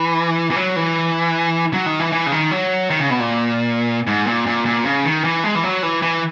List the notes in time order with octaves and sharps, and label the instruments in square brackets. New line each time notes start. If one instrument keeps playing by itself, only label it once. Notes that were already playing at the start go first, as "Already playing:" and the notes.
Already playing: [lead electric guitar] E3
E3
F#3
E3
F#3
D#3
E3
E3
C#3
D#3
F#3
D#3
C#3
B2
A#2
G#2
A#2
A#2
A#2
C#3
D#3
E3
G#3
E3
F#3
E3
E3